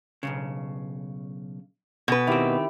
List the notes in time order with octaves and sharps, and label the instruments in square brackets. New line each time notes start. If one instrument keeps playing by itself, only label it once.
[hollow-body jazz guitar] B1 E2 C#3
[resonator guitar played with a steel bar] B2 B4 [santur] G#5
[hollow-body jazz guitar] D#3 C4 [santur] E4 G4